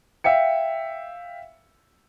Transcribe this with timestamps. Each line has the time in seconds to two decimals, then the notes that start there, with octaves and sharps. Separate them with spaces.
0.24 E5 F5 G5 C#7